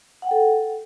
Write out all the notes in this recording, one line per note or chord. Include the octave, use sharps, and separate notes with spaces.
A4 F#5 G5